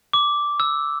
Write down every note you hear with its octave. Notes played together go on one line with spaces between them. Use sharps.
D6
E6